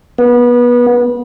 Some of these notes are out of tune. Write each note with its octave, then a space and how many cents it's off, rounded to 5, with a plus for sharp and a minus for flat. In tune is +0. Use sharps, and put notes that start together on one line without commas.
B3 -25